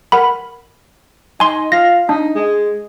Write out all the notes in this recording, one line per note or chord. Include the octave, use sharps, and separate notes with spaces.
A#4 F#5 B5
D#4 G#5 C6
F4 A#6
D4 D#4
G#3